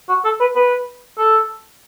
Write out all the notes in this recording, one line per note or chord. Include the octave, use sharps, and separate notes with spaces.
F#4
A4
B4
B4
A4